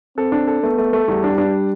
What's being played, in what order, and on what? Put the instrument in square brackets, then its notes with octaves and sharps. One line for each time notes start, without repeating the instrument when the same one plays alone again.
[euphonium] C4 [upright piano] A4
[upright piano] D4
A4
[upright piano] A3 [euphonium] B3
[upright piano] A3
A3
[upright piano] E2 [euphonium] G3
[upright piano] D4
D4